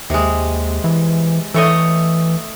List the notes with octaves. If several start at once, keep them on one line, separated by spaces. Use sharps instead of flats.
D#2 C3 G#3
E3
E3 A3 C#5 D#5